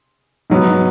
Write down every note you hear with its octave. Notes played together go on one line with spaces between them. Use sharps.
G#2 F#3 B3